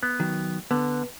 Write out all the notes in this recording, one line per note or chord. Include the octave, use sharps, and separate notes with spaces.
B3
D#3 F#3
D3 B3